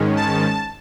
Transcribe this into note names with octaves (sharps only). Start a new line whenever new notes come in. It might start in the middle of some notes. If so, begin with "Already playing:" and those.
Already playing: G#2 D#3 G#3 C#4
A5